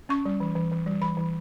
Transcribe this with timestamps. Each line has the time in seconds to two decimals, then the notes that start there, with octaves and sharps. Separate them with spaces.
0.09 C#4 C#6
0.25 G3
0.40 E3
0.55 E3
0.71 E3
0.86 G3
1.02 E3 B5
1.17 E3